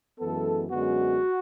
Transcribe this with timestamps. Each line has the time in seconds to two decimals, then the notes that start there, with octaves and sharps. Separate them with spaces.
0.19 F#2 E3 G#3 B3 A4
0.70 F#2 D3 G#3 B3 F#4